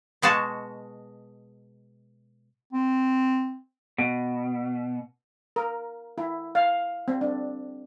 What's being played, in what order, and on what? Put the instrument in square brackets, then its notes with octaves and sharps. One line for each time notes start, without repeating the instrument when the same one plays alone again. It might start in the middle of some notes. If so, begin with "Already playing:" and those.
[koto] B2 G#3 F#4 A5
[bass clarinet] C4
[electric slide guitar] B2
[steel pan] A#4
E4
F5
C4
D4